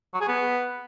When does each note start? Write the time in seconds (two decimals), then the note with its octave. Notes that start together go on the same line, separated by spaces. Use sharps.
0.14 F#3
0.21 G#4
0.28 B3